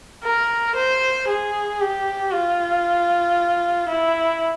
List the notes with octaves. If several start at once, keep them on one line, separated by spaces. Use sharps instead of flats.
A#4
C5
G#4
G4
F4
E4